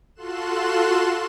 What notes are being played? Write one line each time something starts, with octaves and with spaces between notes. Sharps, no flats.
F4 F#4 A4 C6 F#6 E7